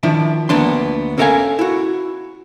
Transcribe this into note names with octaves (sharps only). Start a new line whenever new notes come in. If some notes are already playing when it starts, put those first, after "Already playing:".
D#3 F3 D4 E4
D2 A#3 B3 D4 C6
C#4 A4 A#4 E5 F5 G#5
E4 F#4